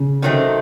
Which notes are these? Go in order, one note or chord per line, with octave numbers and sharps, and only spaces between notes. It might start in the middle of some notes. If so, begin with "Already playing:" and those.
Already playing: C#3
C3 D#3 F#3 A3 C4